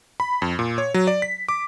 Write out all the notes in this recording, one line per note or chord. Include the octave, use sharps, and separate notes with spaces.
B5
F2
A#2
C#5
F#3
D5
B6
D6